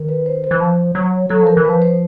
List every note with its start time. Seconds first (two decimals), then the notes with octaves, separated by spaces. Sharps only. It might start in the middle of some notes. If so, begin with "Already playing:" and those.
Already playing: D#3
0.09 B4
0.26 C5
0.44 C5
0.51 E3
0.61 F3
0.95 F#3
1.29 F#3 A4
1.43 F3 A#4
1.57 E3
1.65 B4
1.69 F3
1.82 C5